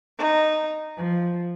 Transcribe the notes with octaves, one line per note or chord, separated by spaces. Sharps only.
D#4
F3